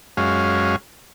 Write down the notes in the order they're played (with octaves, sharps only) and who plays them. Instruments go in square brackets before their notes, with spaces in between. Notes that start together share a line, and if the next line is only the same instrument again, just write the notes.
[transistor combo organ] F#2 G#3 C#4 F5